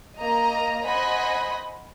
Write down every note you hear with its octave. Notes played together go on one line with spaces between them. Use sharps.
A#3 D#5 A#5
C5 D#5 F#5 G#5 B5